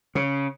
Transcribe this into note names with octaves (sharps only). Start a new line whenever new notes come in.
C#3